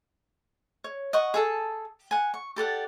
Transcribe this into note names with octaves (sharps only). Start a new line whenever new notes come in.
C#5
D#5 F#5 C#6
G#4 A4 A5
F#5 G#5
C#6
G4 A4 D5 F#5